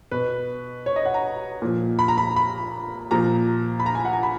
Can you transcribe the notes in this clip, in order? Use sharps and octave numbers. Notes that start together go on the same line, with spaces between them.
B2 B4
C#5
D#5
F#5
A#5
A#2 F3
B5
A#5
B5
B5
A#2 F3 A#5
B5
A#5
G#5
F#5
A#5
B5